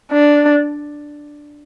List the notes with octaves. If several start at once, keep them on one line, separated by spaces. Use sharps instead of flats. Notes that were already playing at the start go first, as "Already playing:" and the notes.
D4